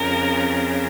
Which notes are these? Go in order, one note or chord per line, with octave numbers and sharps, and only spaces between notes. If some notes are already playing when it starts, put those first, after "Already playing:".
Already playing: F2 C#3 A#4